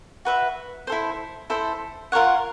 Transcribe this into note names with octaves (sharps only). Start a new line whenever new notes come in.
F#4 B4 E5
E4 A4 C5
E4 A4 C5
F4 A#4 C#5 F#5